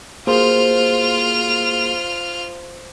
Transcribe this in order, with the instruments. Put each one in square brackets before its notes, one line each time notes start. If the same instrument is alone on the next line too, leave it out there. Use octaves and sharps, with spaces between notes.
[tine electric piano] A#3 F#4 G#4 [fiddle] F4 F6 [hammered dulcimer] C5